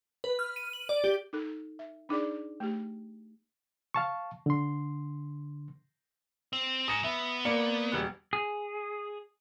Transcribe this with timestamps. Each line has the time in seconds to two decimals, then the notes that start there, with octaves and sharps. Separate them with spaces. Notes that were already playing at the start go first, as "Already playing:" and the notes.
0.24 B4
0.39 F6
0.56 D#7
0.73 F#7
0.89 D5
1.04 G4
1.33 D#4 A4
1.79 E5
2.09 D4 D#4 G#4 D5 D6
2.60 A3 G4
3.94 F5 A5 C#6
4.46 D3 C6
6.53 C4
6.88 G#2 D#6 A#6 C#7
7.04 B3 E5
7.45 A#3 D5 C#7
7.92 E1 G3 F#6
8.33 G#4